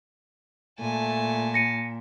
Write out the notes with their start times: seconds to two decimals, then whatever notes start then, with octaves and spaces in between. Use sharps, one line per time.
0.80 A#2 A3 G#5 A5
1.54 A#6 C#7 D#7